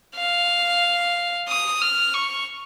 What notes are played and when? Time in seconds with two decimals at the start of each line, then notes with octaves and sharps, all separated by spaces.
0.17 F5
1.49 D#6
1.81 F6
2.14 C#6